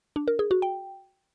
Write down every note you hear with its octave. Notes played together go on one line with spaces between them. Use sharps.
D4
A#4
G#4
F#4
G5